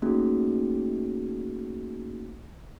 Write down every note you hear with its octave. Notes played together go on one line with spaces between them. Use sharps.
A3 A#3 C#4 D#4 F#4 G#4